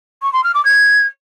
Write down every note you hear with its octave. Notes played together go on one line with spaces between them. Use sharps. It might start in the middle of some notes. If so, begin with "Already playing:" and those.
C#6
C6
F6
D6
G#6